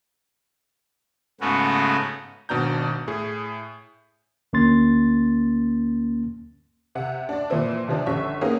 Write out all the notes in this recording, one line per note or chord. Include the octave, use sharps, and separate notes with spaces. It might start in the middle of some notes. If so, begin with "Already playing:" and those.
G#2 C#3 A3 B3 C#4 F#4
G#1 B2 D4 A#5 G6
A2 G#4
D2 A#3 C#4 C6 A6
C3 F#5
D4 D5
A#2 E3 F3 C4 E4
C3 E3 F3 D4 G4
G1 C#4 E5 C#6
A#3 B3 C#4 D#4 G#4 A#4